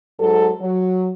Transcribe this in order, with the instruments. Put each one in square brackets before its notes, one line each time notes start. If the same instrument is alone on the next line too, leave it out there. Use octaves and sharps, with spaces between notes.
[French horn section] G#2 F#3 A4
F#3